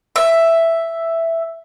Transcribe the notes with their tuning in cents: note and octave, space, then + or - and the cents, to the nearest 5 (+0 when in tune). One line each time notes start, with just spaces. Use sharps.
E5 +5